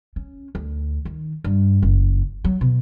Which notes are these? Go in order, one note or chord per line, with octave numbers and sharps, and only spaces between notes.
C#4
D2
D#3
G2
F#1
F#3
B2